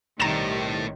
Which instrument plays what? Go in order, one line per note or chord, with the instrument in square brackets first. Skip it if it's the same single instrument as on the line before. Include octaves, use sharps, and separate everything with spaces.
[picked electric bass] B1 [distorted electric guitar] A2 [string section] C3 D#3 G3 [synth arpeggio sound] A#5 E7